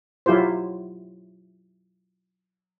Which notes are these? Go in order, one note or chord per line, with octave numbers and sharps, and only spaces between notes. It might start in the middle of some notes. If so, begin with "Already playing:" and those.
F#3 E4 F4 G4 C5